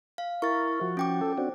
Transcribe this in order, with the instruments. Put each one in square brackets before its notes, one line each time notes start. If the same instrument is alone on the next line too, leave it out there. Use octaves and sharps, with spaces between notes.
[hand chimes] F5
[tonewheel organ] E4 A#4 [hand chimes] C#6 A6
[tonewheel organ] F3 F#4
[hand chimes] C#4 G5 D6
[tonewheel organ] A4
C4 D4 F#4